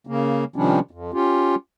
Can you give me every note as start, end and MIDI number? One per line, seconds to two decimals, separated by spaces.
0.07 0.44 49
0.07 0.44 58
0.56 0.79 48
0.56 0.79 51
0.56 0.79 53
0.56 0.79 55
0.56 0.79 61
0.56 0.79 62
0.91 1.11 41
1.14 1.55 61
1.14 1.55 65
1.14 1.55 67